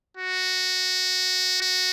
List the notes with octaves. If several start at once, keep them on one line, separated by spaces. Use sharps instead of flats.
F#4
F#4